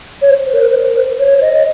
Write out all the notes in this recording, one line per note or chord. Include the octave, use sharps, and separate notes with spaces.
C#5
C5
A#4
C5
A#4
C5
C#5
D#5
D#5